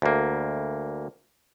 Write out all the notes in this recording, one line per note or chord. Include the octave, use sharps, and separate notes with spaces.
D2 A#3